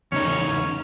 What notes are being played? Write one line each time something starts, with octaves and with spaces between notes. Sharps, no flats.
E2 C#3 C#4 D#4